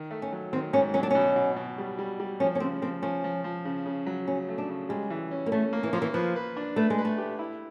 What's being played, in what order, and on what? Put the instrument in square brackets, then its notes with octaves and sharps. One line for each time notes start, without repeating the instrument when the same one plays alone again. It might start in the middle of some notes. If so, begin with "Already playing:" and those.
Already playing: [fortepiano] D#3
A3
[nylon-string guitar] C#4
[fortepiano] F#3
[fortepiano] D#3 [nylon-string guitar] C4
[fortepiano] G#2 [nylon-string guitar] C#4
[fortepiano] F#3 [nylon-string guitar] C#4
[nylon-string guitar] D4
[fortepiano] B2 [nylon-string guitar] C#4
[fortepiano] B2
B2
G3
G3
G3
[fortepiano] F3 [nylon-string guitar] C#4
[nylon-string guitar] C#4
[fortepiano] C#3 [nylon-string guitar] C4
[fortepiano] F3 [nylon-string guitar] C4
[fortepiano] F3 [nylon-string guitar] C#4
[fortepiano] F3
F3
C#3
C#3
F#3
[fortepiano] C#3 [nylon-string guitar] C#4
[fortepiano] A3
[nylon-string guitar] D4
[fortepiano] C#3
[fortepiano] G3 [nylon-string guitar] G#3
[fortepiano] E3
C#4
[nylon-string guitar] A#3
[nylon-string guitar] A3 [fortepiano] C#4
[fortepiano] A#3
[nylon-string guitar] E3
[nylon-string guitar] F3 [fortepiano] A#3
[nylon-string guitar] E3
[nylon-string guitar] F3 [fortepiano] B4
[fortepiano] B4
D4
[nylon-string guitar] A3 [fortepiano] B4
[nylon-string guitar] G#3
[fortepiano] B4
[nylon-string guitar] A3
[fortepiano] G4
E4